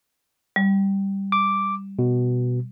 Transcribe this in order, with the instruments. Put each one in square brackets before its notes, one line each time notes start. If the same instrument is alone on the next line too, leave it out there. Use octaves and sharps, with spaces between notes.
[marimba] G3
[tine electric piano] D6
B2